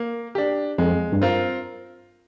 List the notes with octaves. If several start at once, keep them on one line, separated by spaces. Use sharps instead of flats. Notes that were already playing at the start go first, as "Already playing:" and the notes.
Already playing: A#3
D4 G4
F2 G#3
G2
C4 F4 A#4